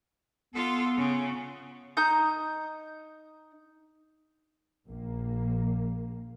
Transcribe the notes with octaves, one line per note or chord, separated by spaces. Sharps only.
B3 F4 A4
C#3
D#4 A#5 D#6 G6
A#1 A#3